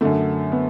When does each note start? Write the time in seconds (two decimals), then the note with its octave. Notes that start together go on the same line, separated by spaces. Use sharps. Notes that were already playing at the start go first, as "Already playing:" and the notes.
0.01 F#2 D3 A3
0.52 B3